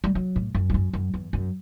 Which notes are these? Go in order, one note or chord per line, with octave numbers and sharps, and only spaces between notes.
G3
F#3
A2
F#2
G2
F#2
F#2
E2
F#2